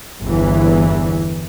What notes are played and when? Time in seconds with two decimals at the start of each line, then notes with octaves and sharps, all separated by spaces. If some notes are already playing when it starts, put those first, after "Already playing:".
0.23 G1 E2 E3